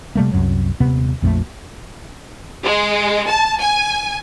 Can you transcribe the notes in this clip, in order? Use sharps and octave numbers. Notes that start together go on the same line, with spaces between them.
C3 G3 A3 A#3
C2 F#2 F#3
D#1 C3 B3
A#1 F2 F3 A3
G#3
A5
G#5